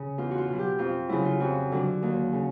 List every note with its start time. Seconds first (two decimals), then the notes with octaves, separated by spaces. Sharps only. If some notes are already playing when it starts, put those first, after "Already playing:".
Already playing: C#3
0.18 E2 F4
0.31 F#4
0.38 F4
0.48 B2 F#3
0.59 G4
0.78 F2 F4
1.09 C#3 F#3 E4
1.25 F4
1.40 F2 F#4
1.72 D3 F#3
2.02 D#2
2.33 C#3